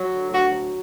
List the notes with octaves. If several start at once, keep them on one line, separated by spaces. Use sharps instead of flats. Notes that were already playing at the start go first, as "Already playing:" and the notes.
Already playing: F#3
D3
D2 F#4
F#3